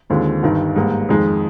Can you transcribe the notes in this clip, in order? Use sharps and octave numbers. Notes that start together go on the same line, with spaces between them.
D#2 D3 G#3 C4 F4
G1 G2 D#3
G#2 G3 A#3
F2 D#3 G#3 D#4